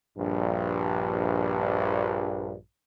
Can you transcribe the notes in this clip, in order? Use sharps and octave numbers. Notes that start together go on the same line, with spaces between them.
A#1 G2